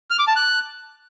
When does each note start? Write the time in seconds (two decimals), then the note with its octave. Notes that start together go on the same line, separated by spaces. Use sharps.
0.10 F6
0.19 D6
0.27 A5
0.36 F#6